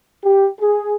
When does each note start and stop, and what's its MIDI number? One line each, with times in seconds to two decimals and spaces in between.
0.24 0.47 67
0.61 0.94 68